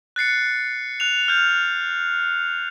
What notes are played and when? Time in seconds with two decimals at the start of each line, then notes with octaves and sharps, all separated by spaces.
0.16 F#6 A6 C7 C#7
1.00 F#6 F7
1.28 F6 G6